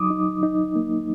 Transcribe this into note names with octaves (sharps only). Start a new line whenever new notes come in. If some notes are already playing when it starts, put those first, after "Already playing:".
Already playing: F#3 D#4 D6 D#6
D#4
D#4
A#3